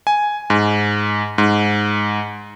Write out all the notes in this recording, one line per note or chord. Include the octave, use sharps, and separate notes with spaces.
G#5
G#2
G#2